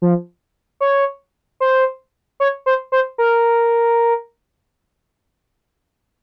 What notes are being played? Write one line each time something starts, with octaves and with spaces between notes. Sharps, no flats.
F3
C#5
C5
C#5
C5
C5
A#4